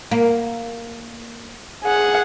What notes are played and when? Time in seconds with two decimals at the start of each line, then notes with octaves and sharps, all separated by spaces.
0.11 A#3
1.84 G#4 F#5